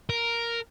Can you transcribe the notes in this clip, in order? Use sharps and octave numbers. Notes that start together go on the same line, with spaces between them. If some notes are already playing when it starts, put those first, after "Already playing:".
A#4